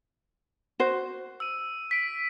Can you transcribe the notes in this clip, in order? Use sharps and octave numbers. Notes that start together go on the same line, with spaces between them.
F#4 C5
E6 D#7
B6 D7